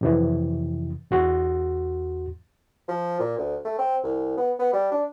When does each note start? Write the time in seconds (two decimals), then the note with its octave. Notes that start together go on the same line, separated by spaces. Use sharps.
0.01 F2 C3 E3
1.11 E2 F#4 C6
2.89 F3
3.20 A#2
3.38 D2
3.65 A3
3.79 C4
4.04 C2
4.37 B3
4.60 B3
4.73 G3
4.92 D4